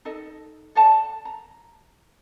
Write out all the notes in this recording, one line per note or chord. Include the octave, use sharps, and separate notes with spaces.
D#4 A4 D#5
A4 D5 F#5 A5
A#5